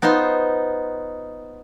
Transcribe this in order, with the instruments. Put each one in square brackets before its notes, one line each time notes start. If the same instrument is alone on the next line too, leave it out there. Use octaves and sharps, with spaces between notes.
[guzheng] B3 D#4 F4 C5 C6